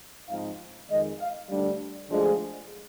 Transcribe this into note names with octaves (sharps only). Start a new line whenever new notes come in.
G#2 F3 C4 D#4 F5
F2 D#3 G#3 D#5
F5
D2 D3 G3 D4
D2 D3 F3 G#3